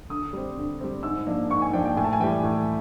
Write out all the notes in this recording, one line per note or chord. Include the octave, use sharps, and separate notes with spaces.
D3 D#6
G3 C4
D3
G3 C4
G#2 E6
F3 A#3 D4
G#2 C#6
G#5
F3 A#3 D4 G5
G5
A2 G#5
A5
G#5
E3 G3 G5
A2